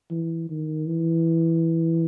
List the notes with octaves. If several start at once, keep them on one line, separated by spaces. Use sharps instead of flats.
E3
D#3
E3